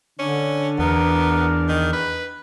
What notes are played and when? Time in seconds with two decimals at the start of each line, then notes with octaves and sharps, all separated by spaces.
0.19 D3 C#4 D4
0.79 E2 B3 A#4
1.69 D#3
1.93 B4